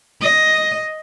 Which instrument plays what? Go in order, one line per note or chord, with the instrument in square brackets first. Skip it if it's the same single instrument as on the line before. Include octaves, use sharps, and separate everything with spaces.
[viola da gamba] D#5